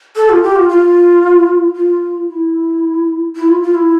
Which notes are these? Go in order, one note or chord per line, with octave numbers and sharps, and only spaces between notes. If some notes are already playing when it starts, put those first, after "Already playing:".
A4
F4
G4
F4
F4
F4
E4
E4
F4
F4
E4